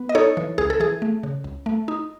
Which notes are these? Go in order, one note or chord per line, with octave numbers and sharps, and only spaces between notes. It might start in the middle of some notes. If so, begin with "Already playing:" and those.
Already playing: B3
D#5
D#4 A4 C#5
E3
C#2 G#4
A4
E3 G#4
A3
C#3
C#2
A3
D#4